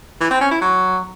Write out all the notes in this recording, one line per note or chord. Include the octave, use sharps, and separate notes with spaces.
E3
C4
C#4
E4
F#3